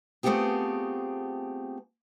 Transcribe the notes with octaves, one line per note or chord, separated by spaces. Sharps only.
A3 B3 C4 F4 G4 G#4